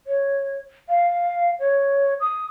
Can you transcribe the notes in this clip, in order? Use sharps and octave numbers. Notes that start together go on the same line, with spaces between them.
C#5
F5
C#5
D#6